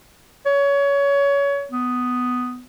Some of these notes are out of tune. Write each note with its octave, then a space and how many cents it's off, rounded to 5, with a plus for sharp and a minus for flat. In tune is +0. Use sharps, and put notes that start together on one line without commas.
C#5 +25
B3 +10